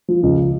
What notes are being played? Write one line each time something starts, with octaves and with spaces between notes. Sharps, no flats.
F3
C#2